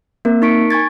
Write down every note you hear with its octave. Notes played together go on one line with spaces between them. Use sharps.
A#3 C4 A#4
D#4 A#4 C#6 B6 C#7 D7
G#5 C#6 G#6 A6